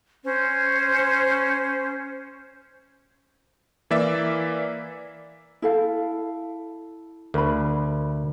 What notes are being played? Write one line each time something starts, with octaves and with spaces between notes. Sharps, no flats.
C#4 C5
E3 A#3 D5 E5
E4 A4 F5
D2 A#4 B5